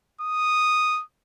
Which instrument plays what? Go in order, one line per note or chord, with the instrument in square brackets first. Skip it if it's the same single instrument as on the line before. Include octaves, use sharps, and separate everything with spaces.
[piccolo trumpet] D#6